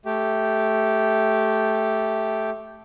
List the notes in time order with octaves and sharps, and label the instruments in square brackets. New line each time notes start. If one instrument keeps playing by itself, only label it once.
[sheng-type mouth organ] A3 G4